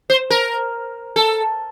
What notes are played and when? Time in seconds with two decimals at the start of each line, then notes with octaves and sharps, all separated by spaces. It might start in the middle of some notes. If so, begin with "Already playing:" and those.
0.10 C5
0.30 A#4
1.16 A4